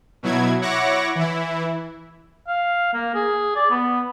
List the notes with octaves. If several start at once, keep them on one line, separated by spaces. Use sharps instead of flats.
B2 F#3 E4 G#6
E4 C#5 F#5 C#6 D6 A#6
E3 E4
F5
A#3
G#4
D5
B3